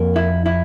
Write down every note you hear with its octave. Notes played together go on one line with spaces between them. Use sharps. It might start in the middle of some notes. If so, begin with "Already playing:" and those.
Already playing: F2 A#3
E4
E4